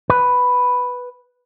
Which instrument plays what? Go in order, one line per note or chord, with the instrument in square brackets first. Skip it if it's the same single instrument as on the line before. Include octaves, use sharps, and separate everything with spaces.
[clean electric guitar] B4